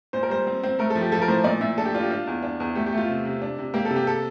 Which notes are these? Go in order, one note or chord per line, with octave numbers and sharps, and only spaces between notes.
A#2 C5
A#4
G3 C5
C4
C4
A3 A#4
A4
F3
G4
F3 A4
A#4
A2 C5
A#2 D5
A#2 E5
D4 A4
G4
D4 F4
G4
D4 F4
E2
D4
E2
A3 G4
G4
A3
F4
C3
C3
D4
C3
A#3 G4
A4
C3
G4
A4